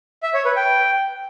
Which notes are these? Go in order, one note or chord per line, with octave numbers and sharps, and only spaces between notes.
E5
C#5
B4
G5